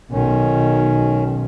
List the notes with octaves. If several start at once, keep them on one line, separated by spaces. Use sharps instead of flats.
B1 D#3 C#4